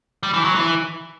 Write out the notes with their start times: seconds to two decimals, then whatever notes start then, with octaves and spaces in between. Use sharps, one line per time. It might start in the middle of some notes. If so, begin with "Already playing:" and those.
0.23 G3
0.34 E3
0.44 F#3
0.55 E3